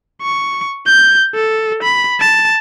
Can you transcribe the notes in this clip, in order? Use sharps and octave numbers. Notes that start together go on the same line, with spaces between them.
C#6
G6
A4
B5
A5